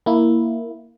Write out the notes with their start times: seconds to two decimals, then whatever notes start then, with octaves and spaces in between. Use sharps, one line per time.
0.06 A#3 E4